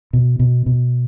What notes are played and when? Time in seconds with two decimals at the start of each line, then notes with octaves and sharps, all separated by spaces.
0.13 B2
0.39 B2
0.66 B2